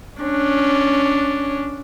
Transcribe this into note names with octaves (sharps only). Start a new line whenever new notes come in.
C#4 D4